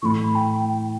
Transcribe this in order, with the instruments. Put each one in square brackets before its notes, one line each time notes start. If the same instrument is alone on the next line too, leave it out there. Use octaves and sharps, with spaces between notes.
[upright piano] A2 E3 A3 [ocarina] B5 C#6
[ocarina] G5
G5